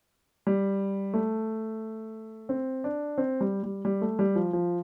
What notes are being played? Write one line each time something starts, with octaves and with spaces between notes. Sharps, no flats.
G3
A3
C4
D4
C4
G3
G3
G3
A3
G3
F3
F3